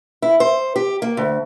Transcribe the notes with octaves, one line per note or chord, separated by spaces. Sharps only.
E4
C5
G4
A#3
D2